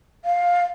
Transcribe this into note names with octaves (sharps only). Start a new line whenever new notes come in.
F5